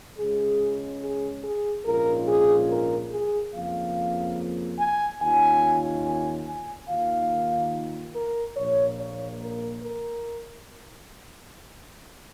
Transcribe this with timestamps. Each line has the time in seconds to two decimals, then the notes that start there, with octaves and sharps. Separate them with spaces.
0.18 C#2 C#3 G#3 C#4 G#4
1.02 G#4
1.44 G#4
1.86 A#1 G#2 G#3 C#4 F4 A#4
2.28 G#4
2.70 A#4
3.11 G#4
3.54 F2 C#3 F3 A#3 F4 F5
4.80 G#5
5.22 D#2 D#3 C#4 F4 G#5
6.06 G#5
6.48 G#5
6.89 D#2 D#3 A#3 F4 F5
8.15 A#4
8.57 A#1 A#2 A#3 C#5
8.99 C#5
9.42 A#4
9.83 A#4